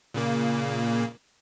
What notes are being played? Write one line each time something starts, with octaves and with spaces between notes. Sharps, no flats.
A#2 C#3 A#3